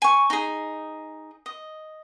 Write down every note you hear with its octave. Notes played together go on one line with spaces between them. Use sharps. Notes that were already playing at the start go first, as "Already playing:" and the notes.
G#5 C#6
D#4 G#4
D#5